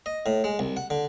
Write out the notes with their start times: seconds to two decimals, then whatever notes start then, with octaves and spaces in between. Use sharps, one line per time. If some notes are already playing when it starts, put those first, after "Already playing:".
0.06 D#5
0.26 A2
0.44 G#3
0.59 C2
0.77 F#5
0.90 D3